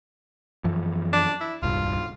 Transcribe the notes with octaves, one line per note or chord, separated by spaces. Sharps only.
F#2 E3 F3
D4
E4
D#1 C2 G2 F4